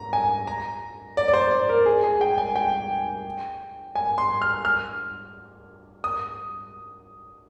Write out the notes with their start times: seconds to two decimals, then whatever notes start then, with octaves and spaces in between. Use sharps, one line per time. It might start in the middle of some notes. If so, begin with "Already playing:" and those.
Already playing: A#5
0.13 G#5
0.47 A#5
1.17 D5
1.28 D5
1.33 C5
1.51 D5
1.69 A#4
1.86 G#4
2.04 G#4
2.21 G5
2.38 G#5
2.56 G5
3.95 G#5
4.18 C6
4.42 F6
4.65 F6
6.04 D#6